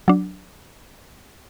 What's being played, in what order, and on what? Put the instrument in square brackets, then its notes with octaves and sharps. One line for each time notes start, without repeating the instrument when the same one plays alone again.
[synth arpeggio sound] F#3 D4